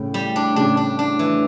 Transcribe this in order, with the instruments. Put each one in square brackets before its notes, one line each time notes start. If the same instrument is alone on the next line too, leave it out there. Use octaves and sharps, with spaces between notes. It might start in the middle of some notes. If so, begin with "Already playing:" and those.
Already playing: [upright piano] A2 C#3
[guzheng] G3
D4
[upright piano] A2 C#3 [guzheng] D4
[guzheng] D4
D4
E3